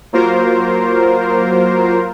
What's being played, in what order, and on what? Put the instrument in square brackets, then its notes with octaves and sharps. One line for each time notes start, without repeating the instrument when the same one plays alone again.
[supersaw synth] F#3 A#3 F4 A#4 C5